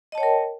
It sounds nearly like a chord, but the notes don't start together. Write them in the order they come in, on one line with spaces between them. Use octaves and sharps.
D#5 A5 C#5 G5 A#4